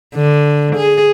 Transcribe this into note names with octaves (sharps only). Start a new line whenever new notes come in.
D3
G#4